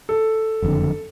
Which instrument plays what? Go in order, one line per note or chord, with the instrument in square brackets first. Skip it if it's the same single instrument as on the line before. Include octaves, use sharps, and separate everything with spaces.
[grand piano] A4
[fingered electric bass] F#1 F2 D3